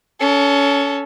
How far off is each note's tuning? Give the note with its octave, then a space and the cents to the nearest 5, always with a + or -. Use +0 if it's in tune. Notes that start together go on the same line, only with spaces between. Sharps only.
C#4 +25 A4 +0